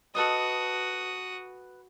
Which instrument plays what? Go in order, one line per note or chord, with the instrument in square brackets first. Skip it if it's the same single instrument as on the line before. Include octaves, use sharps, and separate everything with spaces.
[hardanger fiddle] F#4 D#6 [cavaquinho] A4 B4 D#5